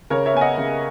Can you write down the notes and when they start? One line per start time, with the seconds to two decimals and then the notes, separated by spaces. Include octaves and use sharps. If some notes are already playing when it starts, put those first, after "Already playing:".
0.10 C#3 A#4 C#5
0.26 C#5 E5
0.34 B3 G#5
0.41 D#5 F#5
0.58 C#3